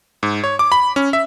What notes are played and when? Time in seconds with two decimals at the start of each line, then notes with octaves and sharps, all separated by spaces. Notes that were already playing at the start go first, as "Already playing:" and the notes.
0.23 G#2
0.44 C#5
0.59 D6
0.72 B5
0.96 C#4
1.13 E5